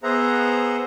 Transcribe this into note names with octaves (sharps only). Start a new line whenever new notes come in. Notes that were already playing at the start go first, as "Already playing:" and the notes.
B3 G#4 C5 E5 F#5 A#5